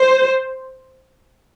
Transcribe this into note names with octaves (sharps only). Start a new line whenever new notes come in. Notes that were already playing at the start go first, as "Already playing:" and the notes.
Already playing: C5